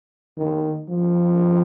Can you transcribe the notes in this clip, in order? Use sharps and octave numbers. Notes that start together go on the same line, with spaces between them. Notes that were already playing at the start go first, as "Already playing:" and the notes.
D#3
F3